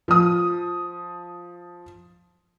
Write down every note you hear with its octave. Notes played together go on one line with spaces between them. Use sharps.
F3 D#6